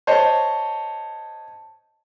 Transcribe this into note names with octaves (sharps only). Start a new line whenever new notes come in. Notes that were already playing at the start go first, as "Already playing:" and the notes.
C5 C#5 D#5 A5